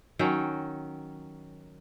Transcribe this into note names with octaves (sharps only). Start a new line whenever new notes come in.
D#3 F#3 C#4 G5